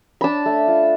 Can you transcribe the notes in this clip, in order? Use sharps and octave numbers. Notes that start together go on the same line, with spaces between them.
D4 A5 B5
A3
F4